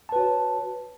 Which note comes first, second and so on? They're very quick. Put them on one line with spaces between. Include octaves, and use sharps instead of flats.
A5 B4 F#4 C#5